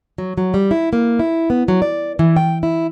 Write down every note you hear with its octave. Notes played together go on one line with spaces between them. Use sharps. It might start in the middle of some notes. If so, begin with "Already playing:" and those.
F#3
F#3
G3
E4
A#3
E4
B3
F#3
D5
E3
G5
E4